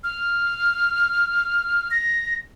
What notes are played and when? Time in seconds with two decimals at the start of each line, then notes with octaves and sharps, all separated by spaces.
0.04 F6
1.91 A#6